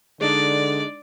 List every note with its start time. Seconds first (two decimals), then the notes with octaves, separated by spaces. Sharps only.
0.21 D3 G#3 D4 D#4 D5